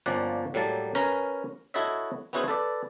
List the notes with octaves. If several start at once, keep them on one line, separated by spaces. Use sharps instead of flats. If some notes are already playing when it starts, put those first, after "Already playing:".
G1 F3 A#3 C#4 D5 F#5
A2 F#3 G3 A#3 A5
C#4 A#4 B4 G#5 A#5
E4 F#4 A4 C#5 D#5 E5
B3 C#4 E4 F#4 G#4 C5
A4 B4 D5